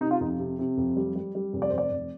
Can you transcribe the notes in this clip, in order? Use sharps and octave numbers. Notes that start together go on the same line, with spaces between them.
C3 D#4
F4
F2 D#4
C3
C3
F2
G3
G3
G3
F1
D5
F1 C5
D5
F1